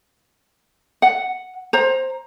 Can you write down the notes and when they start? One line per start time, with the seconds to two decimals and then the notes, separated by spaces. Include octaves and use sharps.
1.02 F#5
1.73 C5 A#5